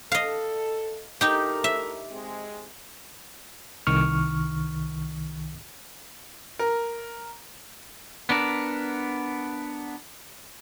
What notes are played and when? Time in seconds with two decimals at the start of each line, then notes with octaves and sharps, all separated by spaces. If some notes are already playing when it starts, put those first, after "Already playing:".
0.12 A4 D#5 F5
1.21 A2 D#4 G4 A4 A#4
1.64 E5
2.10 G#3 C4
3.87 C2 D#3 C#6 F6
6.59 A#4
8.29 B3 D4 A#4